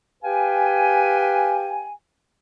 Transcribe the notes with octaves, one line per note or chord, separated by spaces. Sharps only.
G4 B4 F5 G5 G#5